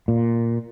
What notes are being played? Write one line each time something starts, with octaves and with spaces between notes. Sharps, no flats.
A#2